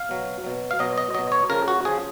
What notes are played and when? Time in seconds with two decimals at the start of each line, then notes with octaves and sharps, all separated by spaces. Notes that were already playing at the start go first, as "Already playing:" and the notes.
Already playing: F5
0.09 B2 F#3
0.44 B2 F#3
0.71 F5
0.79 B2 F#3 D#5
0.98 D#5
1.14 B2 F#3 D#5
1.32 C#5
1.50 C#3 F3 A#4
1.68 F#4
1.85 C#3 F3 G#4